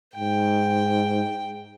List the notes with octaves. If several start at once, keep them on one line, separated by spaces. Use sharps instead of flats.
G#2 G5